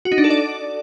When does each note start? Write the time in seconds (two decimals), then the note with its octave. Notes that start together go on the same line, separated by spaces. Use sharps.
0.05 F#4
0.12 D#4
0.18 D4
0.24 A4
0.30 D5